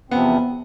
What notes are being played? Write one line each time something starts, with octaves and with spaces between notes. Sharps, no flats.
E2 C3 F3 B3 C4